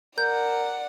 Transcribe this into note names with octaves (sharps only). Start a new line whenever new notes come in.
A#4 D5 F#5 G6